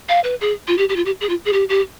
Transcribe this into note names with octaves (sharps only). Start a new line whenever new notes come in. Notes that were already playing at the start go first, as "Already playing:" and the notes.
F5
B4
G#4
F4
G4
G4
F4
G4
G#4
F4
G#4
G4
G4